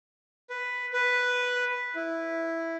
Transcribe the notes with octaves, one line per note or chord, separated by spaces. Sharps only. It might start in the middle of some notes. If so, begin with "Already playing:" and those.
B4
B4
E4